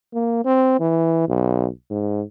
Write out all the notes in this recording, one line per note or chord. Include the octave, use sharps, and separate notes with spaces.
A#3
C4
E3
B1
G#2